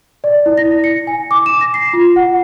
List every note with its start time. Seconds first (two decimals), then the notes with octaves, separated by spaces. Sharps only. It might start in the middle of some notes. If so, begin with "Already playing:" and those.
0.24 D5
0.46 E4
0.58 A#6
0.84 C#7
1.07 G#5
1.31 D6
1.46 E7
1.61 A#6
1.74 C7
1.93 F4
2.16 F#5